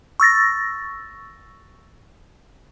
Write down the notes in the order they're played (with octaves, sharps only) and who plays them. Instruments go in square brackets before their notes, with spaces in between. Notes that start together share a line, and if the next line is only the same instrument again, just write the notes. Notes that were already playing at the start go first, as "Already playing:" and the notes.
[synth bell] C#6 E6 A6 A#6